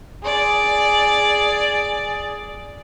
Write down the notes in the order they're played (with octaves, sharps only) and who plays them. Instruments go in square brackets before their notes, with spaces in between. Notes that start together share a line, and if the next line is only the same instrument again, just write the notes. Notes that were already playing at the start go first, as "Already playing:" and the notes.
[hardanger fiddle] G#4 D5